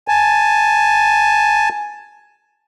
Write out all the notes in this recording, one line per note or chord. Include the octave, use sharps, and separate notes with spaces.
G#5 A5